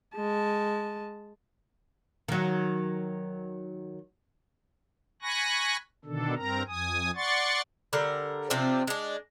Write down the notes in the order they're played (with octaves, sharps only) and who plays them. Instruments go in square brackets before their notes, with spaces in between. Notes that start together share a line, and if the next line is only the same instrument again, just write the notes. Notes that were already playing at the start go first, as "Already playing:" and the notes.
[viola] G#3 A5
[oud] D#3 F#3
[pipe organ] G#5 B5 C#6 F#6 A#6
B2 D3 D#3 D4 A4
G2 C4 A#4 A#5
F2 G#5 D#6
D5 F#5 C6 C#6 A6
[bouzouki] D3 G3 A#4
C3 F3 C4 D4
G#3 D4